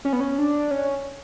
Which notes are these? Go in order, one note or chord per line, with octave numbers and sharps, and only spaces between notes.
C#4
B3
C#4
D4
C#4